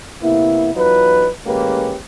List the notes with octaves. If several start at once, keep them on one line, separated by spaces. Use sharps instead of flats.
C3 A#3 B3 E4
E2 F#3 D#4 F4 B4
A1 G#3 A#3 C#4 G4 B4